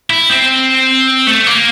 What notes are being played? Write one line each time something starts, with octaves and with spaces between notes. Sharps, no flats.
E4
C4
A3
A#3